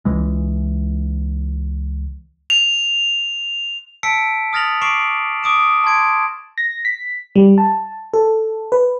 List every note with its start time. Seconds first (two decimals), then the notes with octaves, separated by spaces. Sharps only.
0.05 C#2 E3 G#3
2.50 F7
4.03 A5 E6 B6 C#7 D7
4.53 D#6 F6 A6 A#6 F7 F#7
4.82 C#6 D6 C7 D7 E7 F#7
5.43 D6 D#6 D7 E7
5.84 A5 C6 G#6 D7
6.58 A#6
6.85 B6
7.36 G3
7.58 A5
8.14 A4
8.72 B4